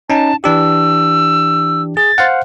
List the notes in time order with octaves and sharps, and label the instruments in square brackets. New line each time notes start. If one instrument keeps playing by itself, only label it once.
[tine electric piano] C#4 D#4 [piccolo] A5
[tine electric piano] E3 D4 G4 [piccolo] E6
[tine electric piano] G#4 [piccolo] A6
[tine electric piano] C5 F5 F#5